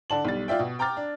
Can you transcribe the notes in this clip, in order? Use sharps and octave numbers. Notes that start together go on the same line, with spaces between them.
D3 D5 A5 F#7
B1 G3 A6
F4 D5 E5 G5
B2
G5 A#5 D6 F6 A6
D4